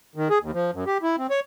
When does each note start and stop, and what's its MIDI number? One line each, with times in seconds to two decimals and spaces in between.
0.15 0.28 51
0.30 0.38 68
0.41 0.51 39
0.53 0.71 53
0.73 0.84 42
0.87 0.98 67
1.02 1.16 64
1.18 1.27 60
1.30 1.40 73